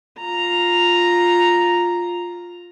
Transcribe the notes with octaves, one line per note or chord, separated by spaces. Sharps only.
F4 A#5